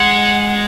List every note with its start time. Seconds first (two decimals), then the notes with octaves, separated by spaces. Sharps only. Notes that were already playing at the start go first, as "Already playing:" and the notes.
Already playing: G#3 F#5